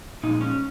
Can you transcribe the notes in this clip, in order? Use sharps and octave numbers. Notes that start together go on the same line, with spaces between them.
A#2 F3 G#3 D#4
C#4